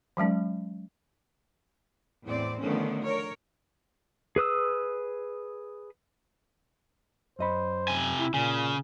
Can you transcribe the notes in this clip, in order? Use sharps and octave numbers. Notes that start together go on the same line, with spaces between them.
E3 F#3 G#3 C#4
E2 A2 C4 D5
D3 D#3 F3 A3 B3 C#4
A#4 C#5
G#4 B4 D#6 E6
F#2 C5 D#5 B5
C3 G#5
E4
A#2 C#3 G#5